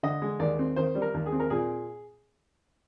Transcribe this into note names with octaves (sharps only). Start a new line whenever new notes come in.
D3 D#5
G#3
D#2 D5
C4
D#3 C5
G3
A#4
D#2
G#4
C4
A#4
A#2 G#4